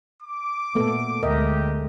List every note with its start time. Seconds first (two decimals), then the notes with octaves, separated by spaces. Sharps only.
0.21 D6
0.75 A#2 A3 B3 A4
1.23 D2 G#3 G4 A#4 D#5 E5